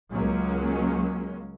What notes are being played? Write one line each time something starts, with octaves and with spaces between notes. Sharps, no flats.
C#2 F#3 G#3 A#3 C#4